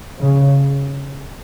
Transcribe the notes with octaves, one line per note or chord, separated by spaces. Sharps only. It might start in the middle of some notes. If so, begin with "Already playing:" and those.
C#3